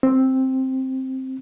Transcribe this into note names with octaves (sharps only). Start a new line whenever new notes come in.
C4